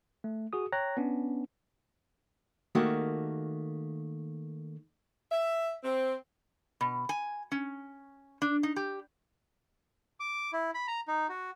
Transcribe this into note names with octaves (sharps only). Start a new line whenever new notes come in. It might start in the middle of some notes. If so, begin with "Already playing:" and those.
A3
F#4 G#4 D#6
C#5 G5 A#5 F#6 A#6
B3 C#4 D4
D#3 A3 A#3 F#4 G4
E5
C4
B2
G#5
C#4
D4
D#4
G4
D6
E4
B5
A#5
D#4
F#4